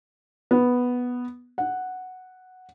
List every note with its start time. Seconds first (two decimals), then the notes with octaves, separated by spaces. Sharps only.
0.51 B3
1.58 F#5